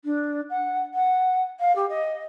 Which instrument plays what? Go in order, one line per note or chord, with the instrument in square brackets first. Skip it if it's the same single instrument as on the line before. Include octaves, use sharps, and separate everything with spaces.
[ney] D4
F#5
F#5
F5
G4
D#5